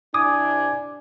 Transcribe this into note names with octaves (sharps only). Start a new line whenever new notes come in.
C3 D4 E4 G#5 D6 D#6